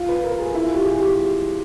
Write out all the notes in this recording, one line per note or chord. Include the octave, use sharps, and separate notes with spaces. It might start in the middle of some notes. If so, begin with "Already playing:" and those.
Already playing: F4
B4
A#4
G#4
E4
F4
G4
G#4
G4